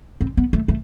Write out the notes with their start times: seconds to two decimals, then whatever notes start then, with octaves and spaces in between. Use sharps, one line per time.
0.21 C4
0.37 B3
0.53 A3
0.68 A3